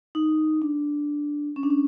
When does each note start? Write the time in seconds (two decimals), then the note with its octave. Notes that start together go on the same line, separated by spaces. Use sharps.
0.15 D#4
0.62 D4
1.56 C#4
1.63 D4
1.70 C#4